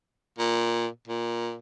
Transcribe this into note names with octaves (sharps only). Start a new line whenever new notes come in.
A#2
A#2